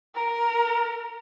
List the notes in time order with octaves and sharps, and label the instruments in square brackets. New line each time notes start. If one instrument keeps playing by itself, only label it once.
[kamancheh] A#4